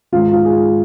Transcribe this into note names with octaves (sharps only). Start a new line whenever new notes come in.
G#2 D#3 G#3 F4
F4
G#4